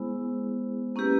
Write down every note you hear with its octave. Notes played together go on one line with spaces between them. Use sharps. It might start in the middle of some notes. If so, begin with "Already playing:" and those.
Already playing: G#3 B3 E4 G#4 C5
A#3 C#4 E4 G4 B4